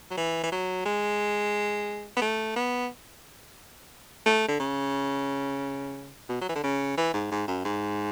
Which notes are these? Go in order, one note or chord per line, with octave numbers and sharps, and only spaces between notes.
F#3
E3
E3
F#3
G#3
B3
A3
B3
A3
D3
C#3
B2
F#3
E3
D3
C#3
E3
G#2
G#2
F#2
G#2